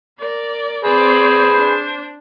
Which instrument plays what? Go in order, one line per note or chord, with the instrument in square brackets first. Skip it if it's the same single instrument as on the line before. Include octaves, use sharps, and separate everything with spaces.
[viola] A#4 D5
[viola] C4 D5 [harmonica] G#4 B4 [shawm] C5
[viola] D4